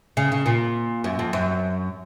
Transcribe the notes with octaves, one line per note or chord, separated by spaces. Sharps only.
C#3
C#3
A#2
F#2
F2
F#2